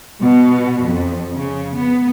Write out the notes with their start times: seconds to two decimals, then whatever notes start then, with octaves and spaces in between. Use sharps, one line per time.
0.22 B2
0.86 F2
1.37 C#3
1.76 B3